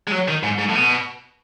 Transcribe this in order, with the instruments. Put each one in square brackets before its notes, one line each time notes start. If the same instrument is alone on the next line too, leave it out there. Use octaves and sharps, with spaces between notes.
[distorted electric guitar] G#3
F#3
D#3
G#2
G#2
A2
B2